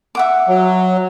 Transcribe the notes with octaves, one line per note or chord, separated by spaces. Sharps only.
E5 F#5 D6
F#3